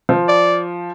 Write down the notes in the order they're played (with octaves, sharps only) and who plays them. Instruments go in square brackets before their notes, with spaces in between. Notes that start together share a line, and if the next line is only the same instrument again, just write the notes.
[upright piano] F3
[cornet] D5